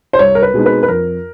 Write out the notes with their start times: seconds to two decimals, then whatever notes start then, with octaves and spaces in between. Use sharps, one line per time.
0.13 C5
0.19 C2 C#5
0.35 A#4
0.43 B4
0.54 B2 G#3 C4 D#4
0.66 B4
0.83 B4
0.88 F2 A#4